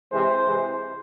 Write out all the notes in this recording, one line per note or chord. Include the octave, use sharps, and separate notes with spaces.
C3 E3 G#3 C5
C3 E3 G#3